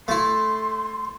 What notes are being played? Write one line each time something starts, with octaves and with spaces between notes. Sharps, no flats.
A3 E4 C6